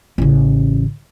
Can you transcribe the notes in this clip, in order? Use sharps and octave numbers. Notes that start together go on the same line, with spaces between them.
A1 C#3